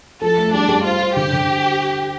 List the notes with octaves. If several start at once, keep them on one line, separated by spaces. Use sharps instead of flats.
F3 A4
A3
G3 D4
G3
F4 C5
C5
D3 G4
D3